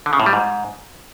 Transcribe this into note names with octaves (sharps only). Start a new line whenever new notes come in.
D3
C#3
A2
G3
G#2